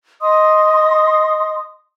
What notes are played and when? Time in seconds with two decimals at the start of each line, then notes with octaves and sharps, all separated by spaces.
0.21 D#5 C6 D#6